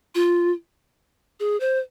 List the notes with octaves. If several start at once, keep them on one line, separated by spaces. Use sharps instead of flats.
F4
G#4
C5